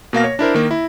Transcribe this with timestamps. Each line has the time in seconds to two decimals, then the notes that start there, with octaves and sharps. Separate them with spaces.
0.13 B2 A#3 F5 A#6
0.24 C#5
0.39 D4 E4 A#4 C5
0.54 D#3 A#3
0.71 E4